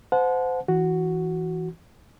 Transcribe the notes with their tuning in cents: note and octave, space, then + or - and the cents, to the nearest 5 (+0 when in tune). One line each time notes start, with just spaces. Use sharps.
C5 -25 F#5 -30 A5 -25
E3 -5 F#4 +0